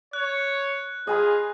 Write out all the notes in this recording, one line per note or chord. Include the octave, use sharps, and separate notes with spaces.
C#5 F#6
F4 G#4 D#5 G#5 B5